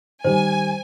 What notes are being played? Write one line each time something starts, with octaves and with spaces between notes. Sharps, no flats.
D#3 G3 C5 G#5